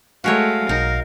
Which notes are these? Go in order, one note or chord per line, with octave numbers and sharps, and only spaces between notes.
G#3 A3 F#4 A#4 C#5 F5
B1 D#4 A#4